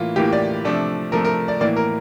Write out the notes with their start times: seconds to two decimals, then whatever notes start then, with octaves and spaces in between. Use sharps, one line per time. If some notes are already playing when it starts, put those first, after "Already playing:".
Already playing: A2 E3 A#3 F4
0.16 A2 E3 A#3 G4
0.33 D5
0.65 C3 F3 A3 D4
1.12 C3 F3 A3 A#4
1.25 A#4
1.48 D5
1.60 A2 E3 A#3 D5
1.77 A#4